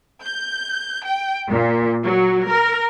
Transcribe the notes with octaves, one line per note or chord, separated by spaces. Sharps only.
G6
G5
A#2
F#3
A#4